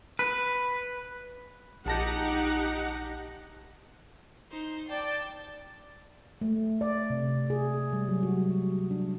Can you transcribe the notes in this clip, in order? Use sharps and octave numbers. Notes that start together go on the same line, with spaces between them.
B4
A#1 D#4 G4 F#5 A5 A#6
D#4 C5
D5 G5 A5
A3
D5
C3
G#4
G3
F#3
F#4
D4